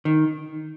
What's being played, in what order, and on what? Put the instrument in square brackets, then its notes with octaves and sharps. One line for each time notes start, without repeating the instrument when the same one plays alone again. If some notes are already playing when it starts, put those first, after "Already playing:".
[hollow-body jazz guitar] D#3